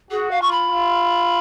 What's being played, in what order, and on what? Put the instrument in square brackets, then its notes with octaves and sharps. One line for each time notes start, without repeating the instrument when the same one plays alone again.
[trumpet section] F#4 [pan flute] G#4
[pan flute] F5
[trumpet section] F4 [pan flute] C#6
[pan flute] B5
[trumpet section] F4